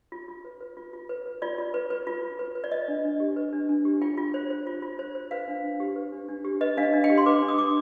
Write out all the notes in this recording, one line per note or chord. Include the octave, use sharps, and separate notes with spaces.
F4
F4
B4
B4
F4
F4
B4
B4
F4 D5
F4
B4
B4
F4
F4
B4
B4
D5
B4 D#5
D4
D4
G4
B4
D4
D4
G4
F4 G5
F4
C5
C5
F4
F4
C5
C5
B4 F5
D4
D4
G4
B4
D4
D4
G4
B4 D#5
D4 F5
D#5
D4
G5
G4
C6
B4 D6
D4
D#6
D4 D6